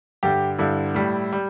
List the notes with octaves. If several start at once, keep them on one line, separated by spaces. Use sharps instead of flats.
G2 D3 G3 G4
G2 D3 G3 E4
A2 G3
G3